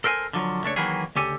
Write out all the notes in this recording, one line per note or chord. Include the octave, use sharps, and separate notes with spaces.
A4 A#4 C5 G5 G#5
D3 F3 F#3
C#2 A3 D4 C#5
D#3 E3 F#3 A#3 B3 G#4
D2 C#3 G4 A4 G#5